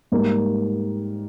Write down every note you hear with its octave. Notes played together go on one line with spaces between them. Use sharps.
G#2 G3 A#3